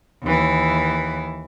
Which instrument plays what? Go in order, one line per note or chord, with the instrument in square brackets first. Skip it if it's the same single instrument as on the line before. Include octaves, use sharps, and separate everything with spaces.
[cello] D#2 E3